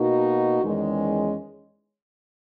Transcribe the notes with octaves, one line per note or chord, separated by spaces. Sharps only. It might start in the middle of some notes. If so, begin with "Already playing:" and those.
Already playing: B2 A#3 D#4 F#4
E2 D#3 G#3 C#4